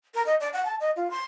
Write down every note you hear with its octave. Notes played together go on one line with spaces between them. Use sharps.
A#4
D#5
D5
F#5
A5
D#5
F4
C6